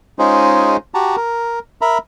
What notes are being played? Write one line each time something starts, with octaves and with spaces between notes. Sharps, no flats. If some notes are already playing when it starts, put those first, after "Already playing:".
G#3 C#4 D#4 F4 G#4 C5
F#4 G4 A5 A#5
A#4
A#4 E5 A#5 B5